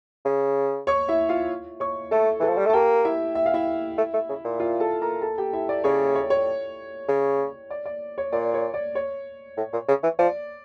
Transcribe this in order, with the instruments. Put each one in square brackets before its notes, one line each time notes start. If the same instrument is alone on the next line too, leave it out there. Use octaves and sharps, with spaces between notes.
[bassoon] C#3
[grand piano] C#5 C#6
E4 E5
F4 F5
C#5 C#6
[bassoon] A3 [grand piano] A4 A5
[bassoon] E3 [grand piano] A4 A5
[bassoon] F3
G3
A3
[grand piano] A5
[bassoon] A#3 [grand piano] G4 G5
[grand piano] E4 E5
E5
F5
E4 E5
[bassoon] A3
A3
C#3
A#2
[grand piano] F4 F5
A4 A5
A#4 A#5
A4 A5
G4 G5
E4 E5
D5
[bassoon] C#3 [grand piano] C#5
[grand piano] C#5
C#5
[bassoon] C#3
[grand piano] D5
D5
C#5
[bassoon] A#2 [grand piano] D5
[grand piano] C#5
D5
C#5
[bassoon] A2
A#2
C#3
E3
[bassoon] F3 [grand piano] D5